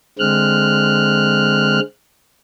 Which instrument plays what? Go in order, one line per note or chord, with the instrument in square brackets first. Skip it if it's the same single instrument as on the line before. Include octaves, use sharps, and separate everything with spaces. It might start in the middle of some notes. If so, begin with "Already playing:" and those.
[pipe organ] D3 G#3 C4 F6 F#6